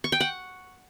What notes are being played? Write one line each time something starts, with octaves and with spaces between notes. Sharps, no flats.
C#6
G5
F#5